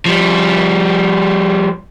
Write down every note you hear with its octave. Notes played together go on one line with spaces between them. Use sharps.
F3 G3